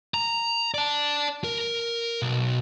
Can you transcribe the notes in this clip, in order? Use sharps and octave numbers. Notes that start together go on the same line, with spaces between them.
A#5
D5 A5
A#4
B1